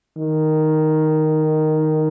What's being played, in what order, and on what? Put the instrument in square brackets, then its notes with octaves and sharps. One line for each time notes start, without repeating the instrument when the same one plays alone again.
[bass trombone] D#3